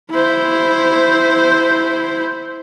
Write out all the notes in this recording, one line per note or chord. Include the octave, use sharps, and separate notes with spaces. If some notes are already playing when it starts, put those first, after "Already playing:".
E4 C5